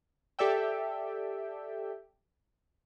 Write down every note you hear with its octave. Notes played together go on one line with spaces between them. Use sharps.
G4 A4 D5 E5 G5